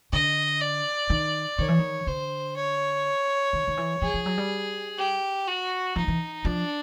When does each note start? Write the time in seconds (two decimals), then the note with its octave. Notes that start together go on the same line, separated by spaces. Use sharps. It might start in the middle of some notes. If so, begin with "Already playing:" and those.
0.13 D3 D#5
0.61 D5
1.10 D#3
1.58 D#3 C#5
1.68 E3
1.79 D#3
2.07 D3 C5
2.56 C#5
3.53 D#3
3.68 D#3
3.77 E3
4.02 F3 G#4
4.14 F3
4.26 F#3
4.38 G3
4.98 G4
5.47 F#4
5.96 F3 D#4
6.08 E3
6.45 F3 D4